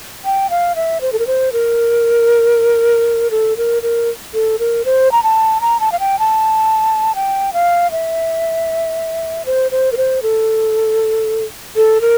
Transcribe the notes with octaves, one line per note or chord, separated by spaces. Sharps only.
G5
F5
E5
C5
A4
A#4
C5
A#4
A4
A#4
A#4
A4
A#4
C5
A#5
A5
A#5
A5
F5
G5
A5
G5
F5
E5
C5
C5
A#4
C5
A4
A4
A#4